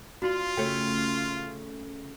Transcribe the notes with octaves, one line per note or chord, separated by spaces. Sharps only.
D4 F4 F#4 C6
C#3 A3 C#4 G5